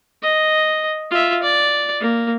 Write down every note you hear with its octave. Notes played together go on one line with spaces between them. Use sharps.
D#5
F4 E5
D5
A#3